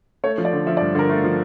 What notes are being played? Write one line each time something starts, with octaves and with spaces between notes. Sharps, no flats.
A3 C#5
F3
D5
D3
F3 E5
D5
G2
D3 A#4
A3 F4
F3